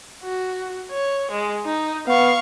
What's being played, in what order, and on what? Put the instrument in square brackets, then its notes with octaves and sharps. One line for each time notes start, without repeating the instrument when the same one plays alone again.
[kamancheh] F#4
C#5
G#3
D#4
[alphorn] B3 [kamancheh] F5 C#6